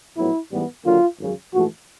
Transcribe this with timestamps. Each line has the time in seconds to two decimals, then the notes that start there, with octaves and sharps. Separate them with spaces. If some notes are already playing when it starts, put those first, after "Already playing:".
0.17 A#1 A2 F#3 B3 E4
0.52 A1 G#2 E3 G3 B3
0.85 D#2 D3 F#3 A#3 F4
1.20 G#1 F#2 C#3 F#3
1.53 A#1 G#2 E3 A3 F#4